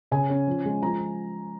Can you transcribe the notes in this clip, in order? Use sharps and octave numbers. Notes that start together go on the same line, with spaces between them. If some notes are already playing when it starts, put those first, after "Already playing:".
C#3 G#5
C#4
F3
G#3
F3 A#5